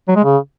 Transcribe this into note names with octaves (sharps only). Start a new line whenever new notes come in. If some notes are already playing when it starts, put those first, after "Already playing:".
F#3
G#3
C#3